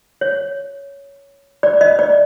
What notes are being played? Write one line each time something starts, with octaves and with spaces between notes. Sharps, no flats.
C#5
D5
D#5
D5